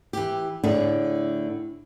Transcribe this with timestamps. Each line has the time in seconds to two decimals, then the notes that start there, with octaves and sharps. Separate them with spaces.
0.13 E3 G4
0.64 A2 D3 D4 E4 G#4